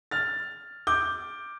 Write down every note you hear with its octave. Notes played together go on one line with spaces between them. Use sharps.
F6 A6
D6 G6